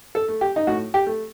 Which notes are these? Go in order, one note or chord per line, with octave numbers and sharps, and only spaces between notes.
A4
A3
G4
D#4
A2 F#4
G4
A3